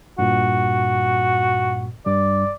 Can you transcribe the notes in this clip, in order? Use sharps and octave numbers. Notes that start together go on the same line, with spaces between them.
G2 A#2 F#4
G2 G3 D5